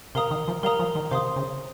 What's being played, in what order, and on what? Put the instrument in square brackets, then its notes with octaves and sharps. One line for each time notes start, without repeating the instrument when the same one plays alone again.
[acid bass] C3 [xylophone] A#4 F5 A#5 D#6
[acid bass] D#3
F3
[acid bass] G3 [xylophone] A#4 F5 A#5 D#6
[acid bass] F3
D#3
[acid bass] C3 [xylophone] C5 F5 C6 D#6
[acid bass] C#3